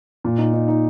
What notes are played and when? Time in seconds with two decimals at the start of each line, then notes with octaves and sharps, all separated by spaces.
0.24 A#2
0.38 D#4
0.54 D#4
0.68 D#4